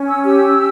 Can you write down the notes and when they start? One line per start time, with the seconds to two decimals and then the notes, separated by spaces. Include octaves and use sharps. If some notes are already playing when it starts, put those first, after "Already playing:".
Already playing: C#4
0.08 E6
0.24 G4 E6